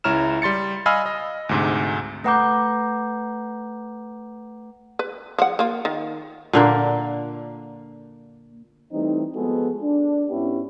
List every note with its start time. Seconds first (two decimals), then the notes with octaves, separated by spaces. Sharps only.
0.04 C#2 E4 C#5 A#5 F6 E7
0.42 G3 C6 A6 C#7
0.86 D#5 F5 G#5 B5 E6 F6
1.06 D#5
1.49 D2 G#2 C3
2.24 A3 B4 F#5 A#5 D6 G6
4.99 B4
5.39 F3 F#5
5.59 A#3 F4
5.85 D#3
6.53 A#2 D3 A#3
8.92 E3 G3 A3 C4 D#4
9.35 F3 G#3 B3 F#4 G#4 A4
9.82 D4
10.30 G#2 B3 C#4 E4 G4